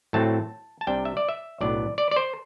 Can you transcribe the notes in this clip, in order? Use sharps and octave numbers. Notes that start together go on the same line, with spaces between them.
A2 F#3 A3 C4 A5
A5
C2 C3 G3 D4 G5
E5
D5
E5
B1 A2 F#3 B3 D4 D5
D5
D5
C5